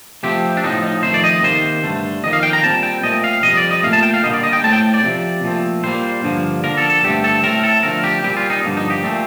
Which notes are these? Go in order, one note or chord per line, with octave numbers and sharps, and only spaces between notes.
C3 F3 A3 C4 G4
D4
A2 F3 C4 D#4
D#4
F2 D#3 A3 C5
D5
D#5
C3 D#3 A#3 C5
G2 D3 A3
F2 D#3 A#3 D#5
F5
G5
A#5
A#2 G3 C4 A5
G5
A#2 A3 C4 D#5
F5
F2 C3 G3 D#5
D5
D#5
A#2 F3 A3 F5
A5
G5
F5
D3 G3 A#3 D#5
D5
D#5
G5
A2 A3 C4 A5
G5
D5
C3 F3 C4
A#2 F3 A3 C4
A#2 G3 A#3 C5
G2 D3 F3 A#3
D3 F3 A#3 A#4
A4
A4
G2 D3 A3 C4 G4
A4
A2 A3 C4 A#4
A4
D3 F3 A3 C4 A#4
G4
A#2 G3 C4 G4
F4
D#4
G2 D3 F3 A#3
D#4
G4
A#2 A3 C4